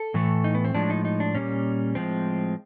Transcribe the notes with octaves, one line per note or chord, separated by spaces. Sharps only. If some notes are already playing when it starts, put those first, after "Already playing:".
Already playing: A4
A2 E3 A3
D#4
B3
C4
A2 F3 G#3 D4
D#4
D#4
D4
A#2 G3 A#3 C#4
A2 F3 G#3 C4